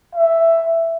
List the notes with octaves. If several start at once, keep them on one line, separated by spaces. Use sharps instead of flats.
E5